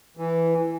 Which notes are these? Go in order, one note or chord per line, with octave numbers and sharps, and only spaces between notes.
E3